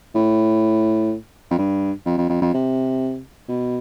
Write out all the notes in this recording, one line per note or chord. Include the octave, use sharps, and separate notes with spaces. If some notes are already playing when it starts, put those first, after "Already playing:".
A2
F2
G2
F2
F2
F2
F2
C3
B2